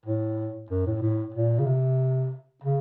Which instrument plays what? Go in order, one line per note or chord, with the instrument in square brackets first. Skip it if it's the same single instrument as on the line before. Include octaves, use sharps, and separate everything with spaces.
[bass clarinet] A2
F#2
A2
A2
A#2
C#3
C3
C#3